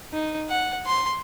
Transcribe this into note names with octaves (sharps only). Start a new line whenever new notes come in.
D#4
F#5
C6